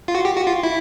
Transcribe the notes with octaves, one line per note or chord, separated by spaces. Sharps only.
F4
F#4
G4
F#4
F4
E4